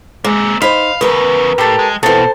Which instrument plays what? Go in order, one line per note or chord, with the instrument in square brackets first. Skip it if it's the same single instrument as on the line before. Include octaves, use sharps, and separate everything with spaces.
[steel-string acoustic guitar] G#3 [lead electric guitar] A#3 C4
[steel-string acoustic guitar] D#4 C5 [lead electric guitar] F5 [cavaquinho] B5
[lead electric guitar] E2 C#3 [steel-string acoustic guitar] A#4 B4
[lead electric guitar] A2 [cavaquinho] G4 A4
[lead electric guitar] G#3
[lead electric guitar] B2 [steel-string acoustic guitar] E3 C4 [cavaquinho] A4 C5